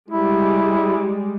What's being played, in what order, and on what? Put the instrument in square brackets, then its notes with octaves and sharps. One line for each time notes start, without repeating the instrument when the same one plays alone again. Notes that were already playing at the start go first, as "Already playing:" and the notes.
[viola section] G3 G#3 [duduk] E4